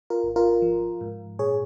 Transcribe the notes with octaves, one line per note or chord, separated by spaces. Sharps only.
F4 A#4
G#1
F4 A#4
F3
G#2
A#2 G#4 C#5